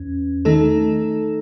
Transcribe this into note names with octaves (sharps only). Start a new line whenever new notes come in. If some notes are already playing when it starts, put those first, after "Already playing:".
Already playing: E2 C#4
D#3 A3 D#4 A4